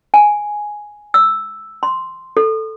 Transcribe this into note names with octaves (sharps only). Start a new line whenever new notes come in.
G#5
E6
C6
A4